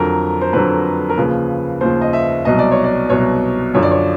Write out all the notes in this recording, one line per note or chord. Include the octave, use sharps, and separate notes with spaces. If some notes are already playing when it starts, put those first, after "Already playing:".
Already playing: F2 D3 F#3 A#4
C5
F2 D3 F#3 B4
A#4
D#2 C#3 F3 B4
D#2 C#3 F3 C5
D#5
E5
C2 B2 F#3 D#5
D5
C#5
D5
C2 B2 F#3 C#5
F#2 D3 F3 C#5
D5
C#5